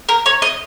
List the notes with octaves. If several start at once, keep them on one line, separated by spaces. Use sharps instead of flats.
A#4
C#5
D#5